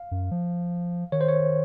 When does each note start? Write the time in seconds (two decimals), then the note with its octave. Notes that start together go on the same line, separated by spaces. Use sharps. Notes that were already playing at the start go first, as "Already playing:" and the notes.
Already playing: F5
0.11 F#2
0.31 F3
1.12 D#3 C#5
1.21 C5
1.28 C#5